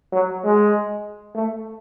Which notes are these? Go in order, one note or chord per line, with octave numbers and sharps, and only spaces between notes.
F#3
G#3
A3